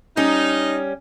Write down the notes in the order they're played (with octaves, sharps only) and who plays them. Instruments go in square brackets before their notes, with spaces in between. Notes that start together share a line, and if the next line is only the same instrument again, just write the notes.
[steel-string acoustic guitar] G3 C#4 [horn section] D#4